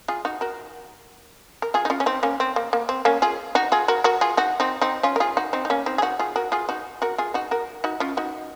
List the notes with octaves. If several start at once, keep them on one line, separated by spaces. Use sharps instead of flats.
F4 G#4
D#4 F#4
F#4 A#4
A#4
F4 G#4
D#4
C#4 F4
C#4
C4 D#4
A#3 C#4
C4
A#3
A#3
C4
A#3 C#4
F4 G#4
D#4 F#4
F4 G#4
F#4 A#4
F#4 A#4
F4 G#4
D#4 F#4
C4 D#4
C4 D#4
C#4 F4
A#4
F4 G#4
D#4 F#4
C4 D#4
D#4
A#3 C#4
C4 D#4
G#4
D#4 F#4
F4 G#4
F#4 A#4
F4 G#4
D#4 F#4
F#4 A#4
F4 G#4
D#4 F#4
F#4 A#4
D#4 F#4
C#4 F4
D#4 F#4